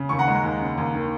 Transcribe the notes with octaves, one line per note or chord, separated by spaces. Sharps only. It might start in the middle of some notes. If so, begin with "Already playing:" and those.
Already playing: C#3
D#2 C#6
F#5 A#5
G#3
D#2
C#3
D#2
D#3